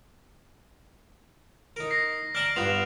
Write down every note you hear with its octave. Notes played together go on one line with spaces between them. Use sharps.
D#4 A#4
A#6 C7
D5 A5 A#5 F6 D7 F#7
G2 B3 F4 F#6 E7 F7